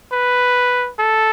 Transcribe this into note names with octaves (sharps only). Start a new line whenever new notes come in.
B4
A4